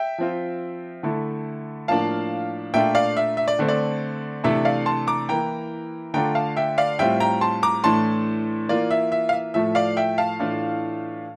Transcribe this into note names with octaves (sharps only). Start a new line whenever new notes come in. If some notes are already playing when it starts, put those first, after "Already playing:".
Already playing: E5 G5
F3 C4 F4
D3 A3 E4
A2 F3 A#3 D4 F5 A5
A#2 A3 D4 F4 E5 G5
D5 F5
E5
E5
D5
D3 A3 C4
D5
C3 E3 A3 D4 E5
D5 F5
A5 C6
A#5 D6
E3 A#3 E4 G5 A#5
D3 A3 D4 F4 G5 A#5
F5 A5
E5 G5
D5 F5
A2 G3 C4 F4 E5 G5
G5 A#5
A5 C6
A#5 D6
A2 E3 A3 D4 A5 C6
E3 A#3 F4 D5
E5
E5
F5
E5
A2 F3 A3 E5
D5 F5
E5 G5
F5 A5
A2 E3 A3 D4 F4